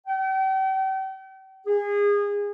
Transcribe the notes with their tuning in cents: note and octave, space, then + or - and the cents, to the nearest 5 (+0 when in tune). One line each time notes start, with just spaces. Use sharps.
G5 -40
G#4 -25